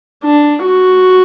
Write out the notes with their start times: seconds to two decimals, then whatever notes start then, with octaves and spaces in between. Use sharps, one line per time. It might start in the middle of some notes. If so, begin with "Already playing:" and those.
0.24 D4
0.65 F#4